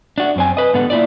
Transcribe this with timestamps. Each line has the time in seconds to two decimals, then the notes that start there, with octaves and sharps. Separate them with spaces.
0.18 D4 F#4
0.36 F#2 C4 G#5
0.57 B4 D#5
0.73 G#2 D3 B3 F#5
0.90 A#3 E4 F4 D5